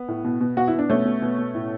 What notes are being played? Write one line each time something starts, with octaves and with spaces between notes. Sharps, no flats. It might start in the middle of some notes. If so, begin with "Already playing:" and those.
Already playing: B3
A2
B2
B2
B2 F#4
E4
B2
D4
B2 A3 C#4
B2
B2
B2
A2